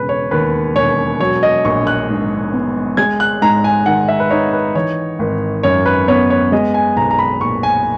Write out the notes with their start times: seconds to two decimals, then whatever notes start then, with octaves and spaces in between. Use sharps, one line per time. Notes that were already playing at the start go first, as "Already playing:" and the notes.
Already playing: E1 C#3 B4
0.09 C#5
0.31 D#2 B4
0.76 E1 C#5
1.20 F#3 C#5
1.43 D#5
1.65 A#1 C#6
1.87 F#6
2.09 G#2
2.53 B3
2.97 G#3 G#6
3.20 F#6
3.42 G#2 A#5
3.64 G#5
3.86 D#3 F#5
4.09 E5
4.20 B4
4.30 D#4 C#5
4.53 B4
4.75 E3 C#5
5.19 G#1
5.63 F#2 C#5
5.86 B4
6.08 B3 C#5
6.30 C#5
6.52 G#3 D#5
6.74 G#5
6.97 B1 A#5
7.11 A#5
7.19 B5
7.41 A#2 C#6
7.63 G#5